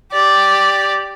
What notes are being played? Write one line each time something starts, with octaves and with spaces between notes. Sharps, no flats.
G4 D5